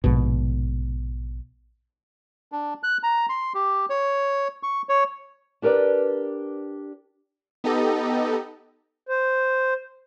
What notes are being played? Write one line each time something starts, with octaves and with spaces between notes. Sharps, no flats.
A#1 G#2 B2
D4
F#6
A#5
C6
G4
C#5
C#6
C#5
D4 G4 A#4 B4 D5
B3 D#4 G4 A4 D#5
C5